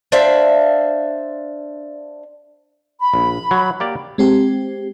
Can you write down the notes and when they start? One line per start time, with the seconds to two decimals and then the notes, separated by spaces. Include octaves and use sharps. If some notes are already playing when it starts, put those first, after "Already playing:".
0.12 D4 C5 E5 F5
2.99 B5
3.14 A#1
3.51 F#3
3.80 A#3 G4 D5
4.18 G#3 C4 G4